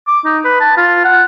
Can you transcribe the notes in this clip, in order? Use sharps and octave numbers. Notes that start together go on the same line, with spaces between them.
D6
D#4
B4
A5
F4
F#5